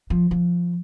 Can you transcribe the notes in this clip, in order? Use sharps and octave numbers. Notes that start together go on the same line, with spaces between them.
F3
F3